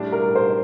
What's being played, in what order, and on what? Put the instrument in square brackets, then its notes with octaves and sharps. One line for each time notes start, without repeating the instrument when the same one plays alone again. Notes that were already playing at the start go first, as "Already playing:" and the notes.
Already playing: [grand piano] A2 G3 D4
[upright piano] A#4
C5